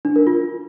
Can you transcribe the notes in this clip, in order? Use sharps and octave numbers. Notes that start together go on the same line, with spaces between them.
D4
A#4
F4